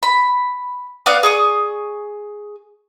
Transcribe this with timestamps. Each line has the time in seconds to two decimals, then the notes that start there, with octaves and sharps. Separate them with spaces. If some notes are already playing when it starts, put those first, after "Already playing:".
0.03 B5
1.06 B3 D5 F5 F#5
1.23 G#4 C#6 D#6